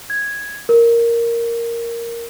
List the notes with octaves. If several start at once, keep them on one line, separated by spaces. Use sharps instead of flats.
G#6
A#4